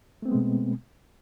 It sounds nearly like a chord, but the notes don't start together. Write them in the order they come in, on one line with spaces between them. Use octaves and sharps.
A3 C4 B3 G#3 B2